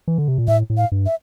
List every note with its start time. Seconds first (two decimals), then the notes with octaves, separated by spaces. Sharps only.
0.08 E3
0.18 D3
0.28 C3
0.38 A#2
0.48 A2 E5
0.70 A2
0.77 F5
0.92 G2
1.06 E5